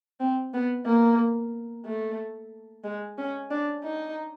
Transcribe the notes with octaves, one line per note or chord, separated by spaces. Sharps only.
C4
B3
A#3
A3
G#3
C#4
D4
D#4